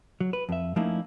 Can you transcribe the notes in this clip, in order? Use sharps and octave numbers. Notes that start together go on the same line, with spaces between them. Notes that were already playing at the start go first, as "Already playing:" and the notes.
F#3
B4
F2 E5
F3 A3 A#3 C#4 D#4 E4